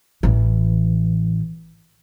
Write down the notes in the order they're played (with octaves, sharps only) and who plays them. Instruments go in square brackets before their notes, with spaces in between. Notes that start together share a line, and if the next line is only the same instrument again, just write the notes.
[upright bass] A1 E3